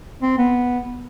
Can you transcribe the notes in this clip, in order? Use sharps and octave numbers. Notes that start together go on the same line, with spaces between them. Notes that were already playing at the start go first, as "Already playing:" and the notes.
C4
B3